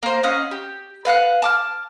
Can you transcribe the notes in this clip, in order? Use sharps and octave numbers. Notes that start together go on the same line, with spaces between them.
A#3 C5
C#4 D#5 F5 F#5
G4
B4 F5 F#5 F#6
A5 D6 F6